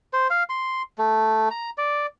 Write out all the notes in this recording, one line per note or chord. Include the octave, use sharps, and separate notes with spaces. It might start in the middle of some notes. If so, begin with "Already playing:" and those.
C5
F5
C6
A3
A#5
D5